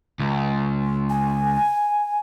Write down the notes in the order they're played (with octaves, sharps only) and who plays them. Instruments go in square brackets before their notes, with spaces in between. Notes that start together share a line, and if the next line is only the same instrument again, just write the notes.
[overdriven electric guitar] C#2
[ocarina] G#5